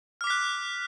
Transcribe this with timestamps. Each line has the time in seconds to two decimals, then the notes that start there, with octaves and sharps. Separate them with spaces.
0.21 F6
0.24 D6
0.27 B6
0.30 F#6